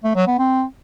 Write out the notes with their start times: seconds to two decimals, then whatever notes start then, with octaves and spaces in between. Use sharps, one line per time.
0.04 A3
0.16 F#3
0.27 B3
0.39 C4